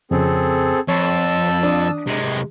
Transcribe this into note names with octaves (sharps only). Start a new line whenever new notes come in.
F2 C#3 C4 G#4 A4
F2 C#5 A5 C6 E6
D4 D#6
C3 G#3